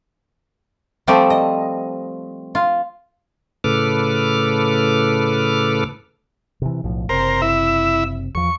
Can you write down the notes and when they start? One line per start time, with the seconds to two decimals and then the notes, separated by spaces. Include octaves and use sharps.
1.07 F3 G3 A3 C4 C5 D5
1.30 D#5
2.55 F4
3.64 A2 C#3 A4 B4 D6 F6
6.62 C3 E3
6.84 B1 A2 F3
7.09 F#1 C3 A#4 C5
7.42 E4 E5
8.35 E2 F3 C#6